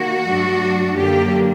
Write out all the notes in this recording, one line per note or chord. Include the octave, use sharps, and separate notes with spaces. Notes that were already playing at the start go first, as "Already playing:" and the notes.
Already playing: D#3 A#3 F#4
G2 F#3 A3 D4
F#2 D3 F#3 A#3 D4 G4